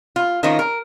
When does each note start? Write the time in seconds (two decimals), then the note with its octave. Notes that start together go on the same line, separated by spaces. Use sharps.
0.16 F4
0.43 D#3 F3 A#3 C#4 D#4
0.59 A#4